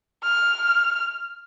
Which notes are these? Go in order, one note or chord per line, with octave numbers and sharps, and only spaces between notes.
F6